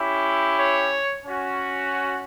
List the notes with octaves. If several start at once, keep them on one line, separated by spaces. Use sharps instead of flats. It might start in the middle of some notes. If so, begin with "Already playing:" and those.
Already playing: C#4 E4 G4
C#5
C#4 F#4